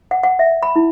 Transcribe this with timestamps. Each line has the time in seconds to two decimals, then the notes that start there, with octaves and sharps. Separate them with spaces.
0.11 F#5
0.23 F#5
0.39 E5
0.63 B5
0.76 E4